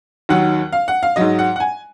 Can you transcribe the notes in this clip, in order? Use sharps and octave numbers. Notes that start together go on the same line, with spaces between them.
D#2 D#3 F#3 F#5
F5
F#5
F5
G#2 F#3 D#5
F#5
F#5
G#5